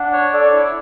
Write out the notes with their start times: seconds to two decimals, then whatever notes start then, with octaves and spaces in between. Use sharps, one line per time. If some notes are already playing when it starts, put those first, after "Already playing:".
Already playing: D4 F#5
0.13 C#5
0.33 A4 D5
0.54 E4